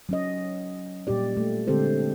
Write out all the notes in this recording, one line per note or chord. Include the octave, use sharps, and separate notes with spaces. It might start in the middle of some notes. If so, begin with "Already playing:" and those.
F#3 C#4 D#5
A#2 G3 G4 D5
A3
D3 G#3 C4 G4 A4 C5